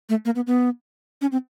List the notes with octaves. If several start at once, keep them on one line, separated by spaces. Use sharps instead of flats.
A3
A#3
B3
B3
C#4
C4